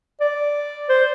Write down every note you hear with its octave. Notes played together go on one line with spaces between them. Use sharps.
D5
C5